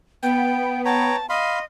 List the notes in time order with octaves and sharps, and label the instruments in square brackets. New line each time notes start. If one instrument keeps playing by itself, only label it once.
[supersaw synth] B3 [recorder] G5
[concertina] C#5 G5 A#5 [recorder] A5
[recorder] D#5 [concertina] F5 B5 C6